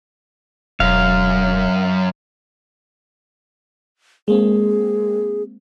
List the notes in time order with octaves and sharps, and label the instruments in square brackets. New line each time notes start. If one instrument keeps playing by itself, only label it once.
[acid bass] E1 [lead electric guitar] F#2 [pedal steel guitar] F5
[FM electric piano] G#3 A#3 C4 [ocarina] G#4